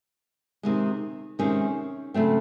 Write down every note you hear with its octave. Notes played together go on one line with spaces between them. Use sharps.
C3 D#3 G#3
C3 D#3 G#3 C#4
C#3 F#3 A3 C4